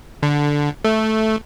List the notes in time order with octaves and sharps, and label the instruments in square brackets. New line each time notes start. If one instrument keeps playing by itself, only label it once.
[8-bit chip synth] D3
A3